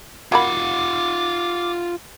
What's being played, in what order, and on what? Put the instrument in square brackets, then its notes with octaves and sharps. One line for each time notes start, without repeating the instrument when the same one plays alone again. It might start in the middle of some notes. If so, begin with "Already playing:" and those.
[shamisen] F#3 A#3 B5 [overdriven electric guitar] F4 F#5 [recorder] D6